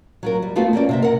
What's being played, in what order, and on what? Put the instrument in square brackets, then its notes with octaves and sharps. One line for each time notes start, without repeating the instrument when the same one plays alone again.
[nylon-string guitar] F#3 F4 A#4
G3
A3 B3 F4 F#4 A4
A#3 C4 C#4 D5
C3 C4 E5
A#4 F#5